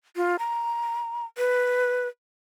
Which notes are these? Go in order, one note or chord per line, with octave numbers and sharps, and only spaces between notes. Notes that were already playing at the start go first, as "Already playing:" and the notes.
F4
A#5
B4